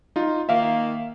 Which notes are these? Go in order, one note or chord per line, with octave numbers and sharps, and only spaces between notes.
D#4 F4
D#3 A#3 E5 F5